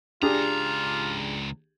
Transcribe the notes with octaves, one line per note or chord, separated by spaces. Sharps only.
C#2 D4 F4 G4 G#4 A#5